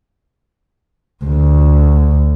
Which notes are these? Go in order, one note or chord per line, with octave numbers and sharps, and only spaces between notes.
D2